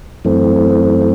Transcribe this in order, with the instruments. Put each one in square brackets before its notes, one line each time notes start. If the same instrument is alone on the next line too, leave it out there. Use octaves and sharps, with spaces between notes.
[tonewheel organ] F#2 E3 A3 C4